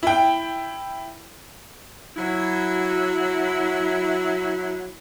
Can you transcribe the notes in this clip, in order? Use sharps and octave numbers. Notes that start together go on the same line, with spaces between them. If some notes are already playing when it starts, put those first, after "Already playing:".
E4 G5
F#3 E4